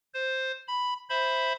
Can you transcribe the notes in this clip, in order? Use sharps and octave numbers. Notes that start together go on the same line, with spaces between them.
C5
B5
C5 E5 B5